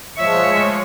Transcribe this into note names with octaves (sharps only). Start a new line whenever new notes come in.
F3 G#3 C#5 E5